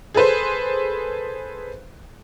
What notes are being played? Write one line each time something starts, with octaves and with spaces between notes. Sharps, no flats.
G#4 A4 B4 C5